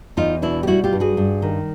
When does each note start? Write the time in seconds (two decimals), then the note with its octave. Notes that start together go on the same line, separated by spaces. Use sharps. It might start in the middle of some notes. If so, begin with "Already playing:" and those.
0.17 E2 D#4 F4
0.42 B2 D4 E4
0.63 G4
0.67 G3 E4 F#4
0.84 F4 G4
0.93 G2
1.00 F#4 G#4
1.17 G2
1.42 D#3